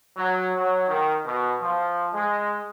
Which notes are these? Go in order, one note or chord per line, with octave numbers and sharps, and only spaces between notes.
F#3
F#3
D#3
B2
F3
G#3